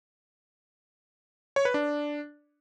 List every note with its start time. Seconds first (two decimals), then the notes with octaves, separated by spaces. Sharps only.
1.56 C#5
1.65 B4
1.74 D4